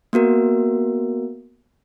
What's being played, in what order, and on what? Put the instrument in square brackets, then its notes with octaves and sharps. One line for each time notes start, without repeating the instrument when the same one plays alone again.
[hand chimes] A#3 B3 F#4 A#4